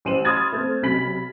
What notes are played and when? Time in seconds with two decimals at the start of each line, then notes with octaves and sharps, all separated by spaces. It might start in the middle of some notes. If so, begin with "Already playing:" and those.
0.05 A1 C5 D#7 E7 F#7
0.25 B5 C6 D#6 F6 G#6 A6
0.52 A3 C4
0.83 B1 C3 B5 B6 F#7